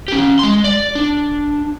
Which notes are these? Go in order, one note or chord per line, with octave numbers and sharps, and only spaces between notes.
C#4 G4
G#3 C6
D5
D4